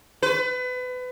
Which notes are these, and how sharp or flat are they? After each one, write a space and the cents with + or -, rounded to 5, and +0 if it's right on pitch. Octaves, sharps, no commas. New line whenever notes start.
B4 +30